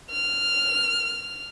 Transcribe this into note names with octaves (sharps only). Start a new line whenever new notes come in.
F6